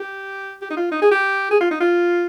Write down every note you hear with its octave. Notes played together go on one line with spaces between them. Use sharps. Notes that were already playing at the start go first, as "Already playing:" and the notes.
Already playing: G4
G4
D#4
F4
D#4
G#4
G4
G#4
F4
D#4
F4